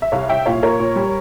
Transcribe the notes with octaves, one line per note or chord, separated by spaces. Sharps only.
E5
C2 C#5 F5
C2 E5 G5
A#2 C#5 F5
A#2 A#4 C#5
A#2
G3